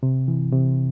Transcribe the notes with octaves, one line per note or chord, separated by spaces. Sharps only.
C3
E3
C3